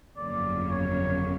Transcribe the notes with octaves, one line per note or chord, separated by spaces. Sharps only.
G1 F2 C#3 F#3 A#3 D5
C#5